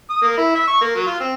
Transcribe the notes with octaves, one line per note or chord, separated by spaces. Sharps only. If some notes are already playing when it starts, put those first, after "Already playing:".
D#6
A#3
E4
E5
C#6
A#3
F#3
F4
C4